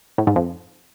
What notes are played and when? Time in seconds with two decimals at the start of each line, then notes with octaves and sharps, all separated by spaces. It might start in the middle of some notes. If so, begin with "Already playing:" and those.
0.18 A2
0.27 G#2
0.36 F2